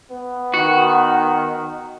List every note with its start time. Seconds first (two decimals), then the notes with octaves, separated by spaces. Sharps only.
0.11 B3
0.54 D#3 F#4